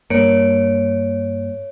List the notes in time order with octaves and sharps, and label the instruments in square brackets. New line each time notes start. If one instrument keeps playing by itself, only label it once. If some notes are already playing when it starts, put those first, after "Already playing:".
[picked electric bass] G2 A#3 [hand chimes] C#5 C#7 D7